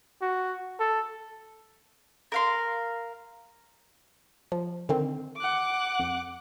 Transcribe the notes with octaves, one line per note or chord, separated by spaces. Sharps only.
F#4
A4
A#4 F5 C6
F3
D3 D#3 C4
F#5 D6
F2